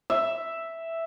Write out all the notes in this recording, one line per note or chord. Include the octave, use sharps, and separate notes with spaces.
E5